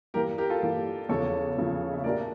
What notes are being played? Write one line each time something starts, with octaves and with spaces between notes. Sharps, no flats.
G2 E3 A#3 G4 A#4
G4 A#4
F4 A4
G2 E3 A#3
E2 C#3 F3 A4 C#5
E2 C#3 F3
E5
A#2 A3 D4 G4 A#4 D5